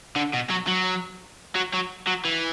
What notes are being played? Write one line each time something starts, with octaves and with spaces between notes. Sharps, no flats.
D3
B2
F#3
F#3
F#3
F#3
F#3
E3